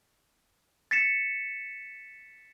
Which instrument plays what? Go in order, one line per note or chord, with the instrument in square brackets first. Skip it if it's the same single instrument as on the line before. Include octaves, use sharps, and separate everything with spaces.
[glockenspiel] A6 B6 C#7 E7